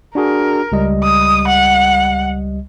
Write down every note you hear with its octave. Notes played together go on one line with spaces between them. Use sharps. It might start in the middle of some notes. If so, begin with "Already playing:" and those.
D4 F#4 G#4 A#4
C#2 G3 D#5
D#6
F#5